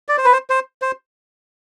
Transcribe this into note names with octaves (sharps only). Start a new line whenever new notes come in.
D5
C5
B4
C5
C5
C5